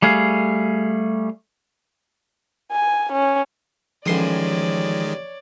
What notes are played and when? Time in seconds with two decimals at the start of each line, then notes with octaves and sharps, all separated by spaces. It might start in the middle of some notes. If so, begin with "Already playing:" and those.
0.02 G3 A3 G#4 F5
2.71 G#5
3.13 C#4
4.06 A1 D#3 F3 G#3 C#5 D5 C6 D#6